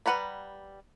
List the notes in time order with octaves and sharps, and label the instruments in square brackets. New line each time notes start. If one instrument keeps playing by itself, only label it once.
[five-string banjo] G3 B4 F#5 A#5 B5